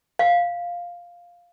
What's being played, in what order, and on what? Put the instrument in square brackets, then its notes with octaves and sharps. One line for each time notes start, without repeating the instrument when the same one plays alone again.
[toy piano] F5